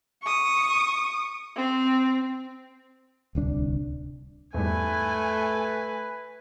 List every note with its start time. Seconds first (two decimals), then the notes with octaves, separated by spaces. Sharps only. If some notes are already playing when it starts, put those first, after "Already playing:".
0.23 C#6 D#6
1.57 C4
3.35 D1 C2 D4
4.54 E2 G#2 G3 A3 B4 G#5